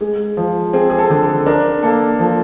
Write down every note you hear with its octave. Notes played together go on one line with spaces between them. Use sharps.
G#3 G#4
F3
C4 G#4
G#4
A4
D3
A4
D4 A#4
A#3 A4
F3 A4